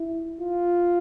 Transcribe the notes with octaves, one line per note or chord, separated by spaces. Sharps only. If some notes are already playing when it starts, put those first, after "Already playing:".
Already playing: E4
F4